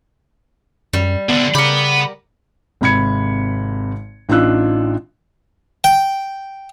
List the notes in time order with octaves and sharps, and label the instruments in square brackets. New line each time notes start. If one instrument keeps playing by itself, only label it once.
[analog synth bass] F#2 [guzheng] G3
[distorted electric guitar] C2 D3 [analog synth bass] B3
[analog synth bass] C#3 [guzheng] G4 A#4 [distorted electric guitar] F#5 B5
[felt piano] G#1 C3 B5 G#6 C#7
A1 D4 D#4 F4 E6 F#6
[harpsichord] G5